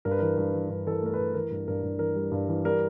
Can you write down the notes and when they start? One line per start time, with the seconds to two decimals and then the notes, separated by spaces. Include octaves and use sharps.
0.05 G2 A#4
0.11 B4
0.19 E3 A#4
0.37 G2 B4
0.53 E3
0.69 G2 B4
0.86 E3 A4
0.92 A#4
1.02 A3 A#4
1.14 G2 B4
1.34 E3 A#4
1.51 G2
1.68 G2 A#4
1.83 G2
1.99 E3 A#4
2.16 G3
2.32 G2
2.48 E3
2.65 G3 A#4